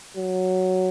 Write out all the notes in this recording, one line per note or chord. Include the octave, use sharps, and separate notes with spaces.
F#3